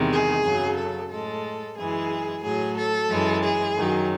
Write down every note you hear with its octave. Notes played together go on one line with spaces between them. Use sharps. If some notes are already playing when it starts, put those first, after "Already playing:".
Already playing: E2 C3 D#3 G#3
G#4
F#2 C#3 F#3
A4
A2 G#3 A4
F#2 E3 G#3 G#4
A2 F#3 G#4
A4
F#2 E3 G#3
G#4
F#2 D#3 F#3